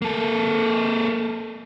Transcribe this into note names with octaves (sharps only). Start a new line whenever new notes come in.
A#3 A4